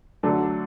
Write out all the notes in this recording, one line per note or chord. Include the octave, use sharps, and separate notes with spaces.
D3 F#3 A3 D4 A4